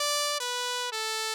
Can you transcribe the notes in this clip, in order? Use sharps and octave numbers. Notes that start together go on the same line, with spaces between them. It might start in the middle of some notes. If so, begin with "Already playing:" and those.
Already playing: D5
B4
A4